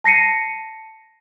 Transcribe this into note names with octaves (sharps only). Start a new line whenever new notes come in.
A5 A#6 C7 C#7 D#7